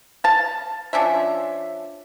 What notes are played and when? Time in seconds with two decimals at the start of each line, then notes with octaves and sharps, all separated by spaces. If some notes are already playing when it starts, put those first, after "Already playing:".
0.24 F5 A5
0.93 F3 C#4 D4 E5